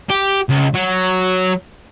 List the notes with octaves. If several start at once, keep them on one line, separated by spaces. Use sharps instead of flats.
G4
C#2
F#3